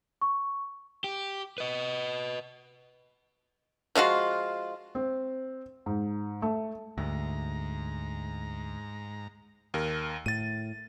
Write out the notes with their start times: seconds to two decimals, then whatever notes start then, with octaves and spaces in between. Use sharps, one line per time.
0.21 C#6
1.04 G4
1.58 B4 D#5
3.95 F3 G#3 F4 F#4
4.95 C4
5.86 G#2
6.42 A3
6.98 D2 G#2 A#5
9.74 D#2 A#4
10.26 A2 A6 D#7